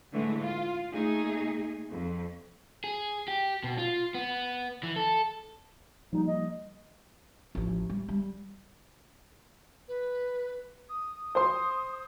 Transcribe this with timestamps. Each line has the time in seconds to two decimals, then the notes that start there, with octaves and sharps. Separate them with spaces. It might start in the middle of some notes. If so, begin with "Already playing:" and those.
0.12 A2 D3 E3 G#3 A3
0.43 F4
0.92 A#2 A3 D#4 G#4
1.89 F2
2.84 G#4
3.28 G4
3.64 B2
3.78 F4
4.14 B3
4.83 E3
4.96 A4
6.13 F3 G3 A#3 D#4
6.27 D#5
7.55 A1 F3
7.89 G3
8.09 G3
9.88 B4
10.89 D#6
11.35 C5 C6